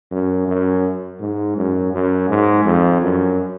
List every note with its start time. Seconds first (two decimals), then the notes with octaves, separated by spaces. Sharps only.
0.12 F#2
0.48 F#2
1.20 G#2
1.57 F#2
1.93 F#2
2.29 G#2
2.65 F2
3.02 F#2